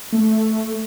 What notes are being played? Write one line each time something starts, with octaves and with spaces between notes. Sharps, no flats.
A3